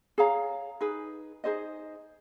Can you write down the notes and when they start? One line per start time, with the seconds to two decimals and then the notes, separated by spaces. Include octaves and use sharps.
0.18 G#4 C#5 F5 A#5
0.81 D#4 G#4 B4
1.44 D#4 G#4 C5 D#5